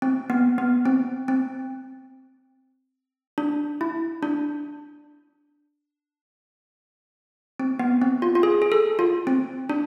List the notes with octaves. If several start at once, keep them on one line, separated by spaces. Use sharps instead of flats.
C4
B3
B3
C4
C4
D4
E4
D4
C4
B3
C4
F4
F4
G#4
G#4
A4
F4
C4
D4